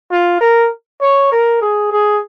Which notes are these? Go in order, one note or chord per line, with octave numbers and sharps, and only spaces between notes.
F4
A#4
C#5
A#4
G#4
G#4